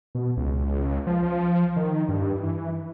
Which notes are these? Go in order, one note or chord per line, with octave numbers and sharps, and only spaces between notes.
B2
C#2
F3
D#3
G2
E3